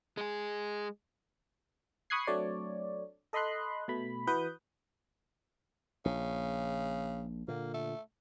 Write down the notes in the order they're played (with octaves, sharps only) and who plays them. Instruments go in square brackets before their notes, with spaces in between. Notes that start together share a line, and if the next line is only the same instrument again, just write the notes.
[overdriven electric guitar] G#3 G#4
[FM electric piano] B5 C#6 D#6 F#6 G#6 C7
F#3 A3 C4 D4 C#5 D5
A4 D#5 B5 C6 F#6
B2 A3 B5
E3 F#4 B4 D#6 G6
[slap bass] A#1 [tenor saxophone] C#3
[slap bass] A#2 D3 [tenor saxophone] A#3
[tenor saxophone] A3